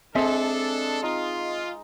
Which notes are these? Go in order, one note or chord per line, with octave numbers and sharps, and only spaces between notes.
G#3 C4 D4 A4 E5
D#4 F4